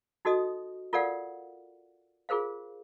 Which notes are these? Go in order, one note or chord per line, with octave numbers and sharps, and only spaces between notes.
D#4 F#4 A4 D#5 D#6
F4 A4 A#4 D5 F5 F#5
F4 G#4 A#4 C5 F5